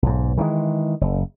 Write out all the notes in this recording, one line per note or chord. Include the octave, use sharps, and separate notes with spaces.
B1 G#2
D#3 E3 F#3 G#3
F#1